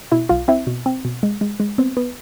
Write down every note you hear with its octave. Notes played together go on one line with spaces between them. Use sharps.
B2 E4 E5
B1 F4 F5
C4 E4 E5
B2
C4
B2
G#3
G#3
G#3
B3 C4 C5
B3 B4